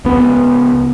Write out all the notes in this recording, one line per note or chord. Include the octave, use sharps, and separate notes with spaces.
C#2 B3